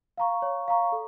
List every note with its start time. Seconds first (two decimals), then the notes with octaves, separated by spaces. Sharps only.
0.18 F5 A#5 C#6
0.42 C#5
0.68 F5 A#5 C#6
0.92 A4